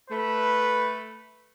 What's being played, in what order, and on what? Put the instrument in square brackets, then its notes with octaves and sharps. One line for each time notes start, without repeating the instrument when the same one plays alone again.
[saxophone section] A3 [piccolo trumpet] B4